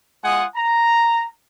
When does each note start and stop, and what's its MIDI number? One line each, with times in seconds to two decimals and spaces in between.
0.23 0.45 56
0.23 0.45 65
0.23 0.45 78
0.23 0.45 80
0.23 0.45 87
0.56 1.26 82